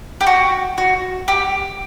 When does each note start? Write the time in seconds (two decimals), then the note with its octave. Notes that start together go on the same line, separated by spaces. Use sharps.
0.21 G4
0.27 F#4
0.78 F#4
1.28 G4